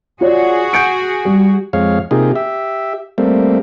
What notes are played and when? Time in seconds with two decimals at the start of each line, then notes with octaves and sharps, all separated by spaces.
0.21 F4 F#4 G#4 C#5 D5
0.73 G6 C#7 D7
1.25 G3
1.73 F2 G#3 C#5 F5
2.11 C3 A#3 D#4 F4 G4 G#4
2.36 G4 E5
3.18 G3 A3 A#3 C4